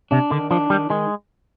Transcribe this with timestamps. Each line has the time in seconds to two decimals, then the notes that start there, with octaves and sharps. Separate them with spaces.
0.11 C3 D4
0.31 D3 D#3
0.51 F3 D4
0.70 D#3 G3
0.90 D#3 G#3